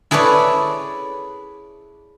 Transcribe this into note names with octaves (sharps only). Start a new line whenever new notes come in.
E4 G#4 A4 B4 C#5 D5